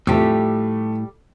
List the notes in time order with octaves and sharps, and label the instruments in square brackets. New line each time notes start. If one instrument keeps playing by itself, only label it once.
[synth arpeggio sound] E2 C3 [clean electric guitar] A2 [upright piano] F3 A3 [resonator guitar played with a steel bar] G3 G4